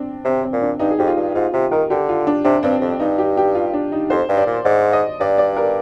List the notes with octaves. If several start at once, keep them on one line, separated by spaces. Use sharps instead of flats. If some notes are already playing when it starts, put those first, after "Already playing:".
Already playing: C4 D4
C3 C4
C4
A#2
D4
G2 D#4
G#4
F2 G4
F4
G2
G#2 F4
C3 F4
D#3 A#4
D3 G4
F4
D4
C3 D4
G2 C4
F2
G2 D#4
G4
G4
F4
D4
D#4
F2 C5
G2
D5
A#2
G#2 D5
D#5
G2 D5
D5
A#4